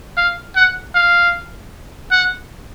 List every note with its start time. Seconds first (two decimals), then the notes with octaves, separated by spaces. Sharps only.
0.17 F5
0.56 F#5
0.95 F5
2.11 F#5